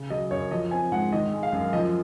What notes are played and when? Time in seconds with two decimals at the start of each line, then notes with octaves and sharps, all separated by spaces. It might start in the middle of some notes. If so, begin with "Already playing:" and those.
Already playing: C#3
0.10 F#3 D#5
0.31 F#2 C#5
0.51 F3 D#5
0.71 C4 G#5
0.92 G#2 F#5
1.12 D#3 D#5
1.33 G#3
1.43 F5
1.52 F#2
1.73 F3 D#5